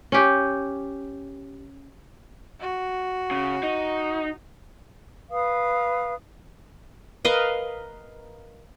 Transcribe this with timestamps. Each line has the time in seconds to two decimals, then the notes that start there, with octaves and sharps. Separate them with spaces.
0.12 C#4 G4
2.60 F#4
3.31 C#3
3.63 D#4
5.31 B4 F5 D#6
7.25 A#4 B4 D#5 F5